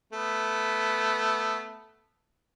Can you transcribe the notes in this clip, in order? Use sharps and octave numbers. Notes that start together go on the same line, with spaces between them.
A3 B3